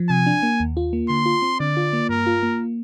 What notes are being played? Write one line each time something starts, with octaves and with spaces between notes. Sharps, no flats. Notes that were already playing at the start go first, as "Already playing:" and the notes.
Already playing: F3
C3 G#5
D4
A#3
D#2
F4
A#3
D3 C6
F4
C4
D3 D5
F4
A#3
G2 A#4
F4
A#3